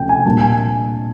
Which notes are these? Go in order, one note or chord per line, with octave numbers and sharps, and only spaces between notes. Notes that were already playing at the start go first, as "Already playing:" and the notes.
Already playing: C3 F3 A3 C#4 G5
G#5
A#2 G3 A#3 D4 A5
G#5